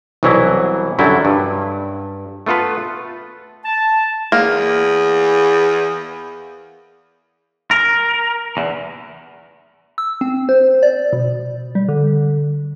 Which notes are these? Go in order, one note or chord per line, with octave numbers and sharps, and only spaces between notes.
C2 B2 E3 F#3 E4
F#2 D3 F#3 G3 E4
G2
A3 B3 F4 A4 B4
A5
E2 A#3
A#4
E2
E6
C4
C5
D5
B2
G3
D3